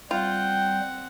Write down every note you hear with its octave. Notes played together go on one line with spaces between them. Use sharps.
G3 C4 F4 F#5 G5